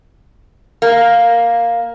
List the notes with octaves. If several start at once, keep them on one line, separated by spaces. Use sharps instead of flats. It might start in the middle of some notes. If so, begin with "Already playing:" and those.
A#3